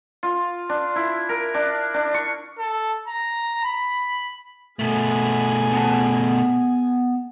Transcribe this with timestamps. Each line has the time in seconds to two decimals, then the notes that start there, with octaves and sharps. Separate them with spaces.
0.23 F4
0.69 D4
0.96 E4
1.29 A#4
1.54 D4
1.94 D4
2.14 C#6
2.58 A4
3.08 A#5
3.64 B5
4.79 B2 A3 G#4 G#5
5.73 B3 A5